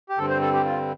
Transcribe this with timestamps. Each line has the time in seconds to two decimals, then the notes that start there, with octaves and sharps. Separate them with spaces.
0.10 G4
0.18 G2 D3 G3 C4 A4
0.30 C5
0.42 A4
0.54 G4
0.65 F4